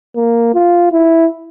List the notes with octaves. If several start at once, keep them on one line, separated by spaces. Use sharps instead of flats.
A#3
F4
E4